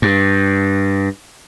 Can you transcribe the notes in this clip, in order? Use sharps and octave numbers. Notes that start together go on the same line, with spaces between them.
G2